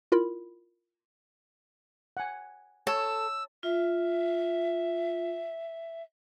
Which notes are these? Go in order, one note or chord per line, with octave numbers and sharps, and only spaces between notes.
E4 F4 A#4 B5
F#5 G#5
A4 C#5 E6
F4 E5